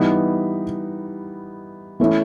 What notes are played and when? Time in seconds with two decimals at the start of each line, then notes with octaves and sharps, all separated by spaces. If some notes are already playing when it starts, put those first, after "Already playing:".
Already playing: E3 G3 B3 D#4
2.00 E3 A3 C#4 E4